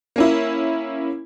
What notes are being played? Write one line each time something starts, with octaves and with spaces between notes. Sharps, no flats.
A#3 C#4 E4